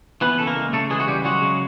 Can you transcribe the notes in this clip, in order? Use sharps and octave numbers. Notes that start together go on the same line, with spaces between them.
E3 B3 B4
C#3 A4
A#3 A#4
G#3
C#3 A3 A4
E3 G#3 G#4
F#4
C#3 G3 G4
F#3 G#3 F#4
C#3